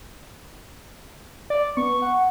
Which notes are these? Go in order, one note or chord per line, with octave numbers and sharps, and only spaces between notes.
D5
B3 C#6
F#5